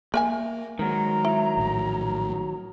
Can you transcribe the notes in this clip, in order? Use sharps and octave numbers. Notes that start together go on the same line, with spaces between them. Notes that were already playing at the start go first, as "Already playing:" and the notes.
A#3 A#4 E5 G#5
D#3 F#3 G#3 A#5
E4
A#1 A2